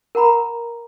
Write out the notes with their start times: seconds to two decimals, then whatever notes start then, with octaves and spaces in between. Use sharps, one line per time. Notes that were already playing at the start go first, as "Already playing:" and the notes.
0.15 A#4 F#5 A#5 B5